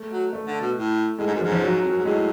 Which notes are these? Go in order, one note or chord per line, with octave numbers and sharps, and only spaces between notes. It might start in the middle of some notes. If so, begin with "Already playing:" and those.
Already playing: A3
F#3
A3
D3
B2
A2
A2 G#3
G#2
F#2
G#2 F3
F3
F#3
F2
F#2
G#2
A2 G#3